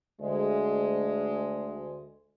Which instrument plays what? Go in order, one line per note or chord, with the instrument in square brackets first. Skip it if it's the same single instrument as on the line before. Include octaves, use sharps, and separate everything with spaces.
[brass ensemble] D2 G#3